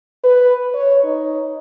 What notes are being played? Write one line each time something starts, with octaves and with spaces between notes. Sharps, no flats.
B4
C#5
D#4